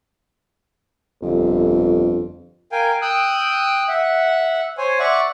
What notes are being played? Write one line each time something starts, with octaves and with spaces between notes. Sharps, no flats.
G1 F2
A#4 F5 G5 G#5
G5 D#6 E6 F#6
E5 F#5
C5 C#5 G#5
D5 E5 F#5 C#6